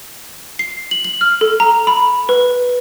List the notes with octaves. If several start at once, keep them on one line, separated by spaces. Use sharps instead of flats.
C7
F#7
F#7
F6
A4
A#5
B5
B4